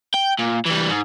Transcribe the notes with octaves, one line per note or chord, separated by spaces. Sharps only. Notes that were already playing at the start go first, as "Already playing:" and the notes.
G5
A#2
E3 G3
G#2